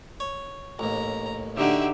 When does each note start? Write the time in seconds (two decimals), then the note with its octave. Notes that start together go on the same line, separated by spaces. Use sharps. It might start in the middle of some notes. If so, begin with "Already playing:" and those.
0.20 C#5
0.79 A1 D#2 A#5
1.56 D3 D#4 F#4 G4 E5